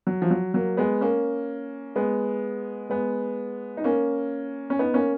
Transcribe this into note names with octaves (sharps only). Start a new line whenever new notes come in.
F#3
F3
F#3
F#3 A#3
G#3 B3
A#3 C#4
G#3 B3
G#3 B3
D#4
A#3 C#4
C#4
B3 D#4
A#3 C#4